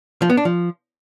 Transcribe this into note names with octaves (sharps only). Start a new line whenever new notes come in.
F3
B3
D4
F3